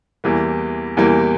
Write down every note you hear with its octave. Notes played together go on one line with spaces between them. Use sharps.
E2 E3 G3 A#3
E2 E3 G3 A#3